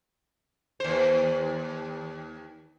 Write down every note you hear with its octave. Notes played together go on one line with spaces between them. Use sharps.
D#2 C5